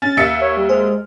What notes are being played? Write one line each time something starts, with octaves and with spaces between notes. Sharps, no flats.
C#4 A6
D#2 E5 C#7
C#5
G3
G#3 C5 F6